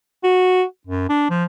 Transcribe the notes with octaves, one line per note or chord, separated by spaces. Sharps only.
F#4
F#2
D4
F3